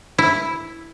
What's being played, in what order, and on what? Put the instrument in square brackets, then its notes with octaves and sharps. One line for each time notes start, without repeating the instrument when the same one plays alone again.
[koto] E4